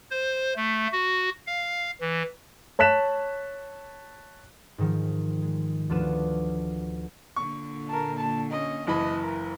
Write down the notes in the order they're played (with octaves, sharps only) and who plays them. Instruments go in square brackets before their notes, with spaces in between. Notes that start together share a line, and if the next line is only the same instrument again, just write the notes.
[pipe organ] C5
A3
F#4
F5
E3
[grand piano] C#5 A5 F#6 B6 E7
[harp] G#2 D#3 F3
G#3
D2 F3 D4 F4 B4 E7
[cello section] A#2 D3 [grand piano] C#6
[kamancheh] A#4 A5
A5
C#4 D#5
[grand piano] F#1 E3 B5 [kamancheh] D#5 A5
[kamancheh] A#4